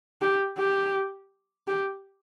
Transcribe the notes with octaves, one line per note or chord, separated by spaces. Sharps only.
G4
G4
G4